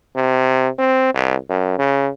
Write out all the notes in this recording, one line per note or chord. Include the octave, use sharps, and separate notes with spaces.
C3
C4
C2
F#2
C#3